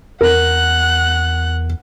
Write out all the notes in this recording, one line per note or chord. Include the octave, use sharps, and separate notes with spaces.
E2 A#4 F#5 F#6